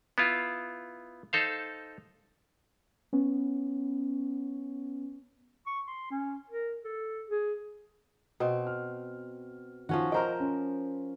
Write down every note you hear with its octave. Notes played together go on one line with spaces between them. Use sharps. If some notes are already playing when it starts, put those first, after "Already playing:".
B3 E4 F4
D#4 A4 C5 F5
B3 C#4
C#6
C6
C#4
A#4
A4
G#4
B2 C4
F6
D#3 F3 C#4 F#4
A#4 C5 D#5 G5 A#5
C#4